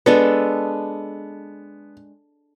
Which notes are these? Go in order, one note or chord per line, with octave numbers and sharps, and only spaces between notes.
G#3 B3 D4 A4